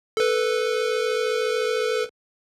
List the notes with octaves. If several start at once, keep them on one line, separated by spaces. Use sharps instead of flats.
A4 B4